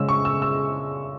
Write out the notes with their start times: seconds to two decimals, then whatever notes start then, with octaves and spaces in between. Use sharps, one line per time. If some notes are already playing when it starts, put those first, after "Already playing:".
Already playing: C#3 G#3 C#4 E6
0.09 C#6
0.25 E6
0.42 E6